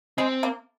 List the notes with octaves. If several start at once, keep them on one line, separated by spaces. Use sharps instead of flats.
G#3 C4
A#3